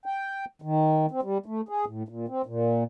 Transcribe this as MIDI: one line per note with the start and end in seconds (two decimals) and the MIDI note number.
0.06 0.45 79
0.62 1.06 51
1.11 1.21 60
1.22 1.38 55
1.46 1.61 57
1.69 1.85 68
1.86 2.03 45
2.09 2.26 46
2.28 2.42 60
2.46 2.84 46